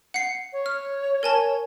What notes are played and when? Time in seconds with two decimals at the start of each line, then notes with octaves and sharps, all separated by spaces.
0.14 F#5 C7
0.53 C#5
0.66 F6
1.23 A#4 G#5 A5